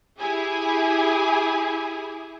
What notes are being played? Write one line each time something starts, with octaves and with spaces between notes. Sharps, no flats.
E4 G4 G#4 G#5